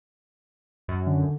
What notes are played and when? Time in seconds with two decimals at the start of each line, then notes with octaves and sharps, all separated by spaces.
0.88 F#2
1.07 D3